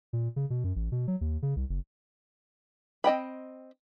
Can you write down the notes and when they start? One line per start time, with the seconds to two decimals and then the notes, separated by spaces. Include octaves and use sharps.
0.13 A#2
0.36 C#3
0.50 B2
0.64 F#2
0.76 A1
0.92 B2
1.07 F#3
1.21 D#2
1.42 C#3
1.56 C2
1.69 F#1
3.04 C4 D#5 G5 B5